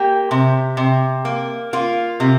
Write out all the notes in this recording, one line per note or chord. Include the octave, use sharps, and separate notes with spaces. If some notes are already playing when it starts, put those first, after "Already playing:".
Already playing: A#3 G4
C3
C3
A#3
A#3 F4
C3